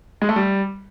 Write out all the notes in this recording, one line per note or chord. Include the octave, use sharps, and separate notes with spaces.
G#3
A3
G3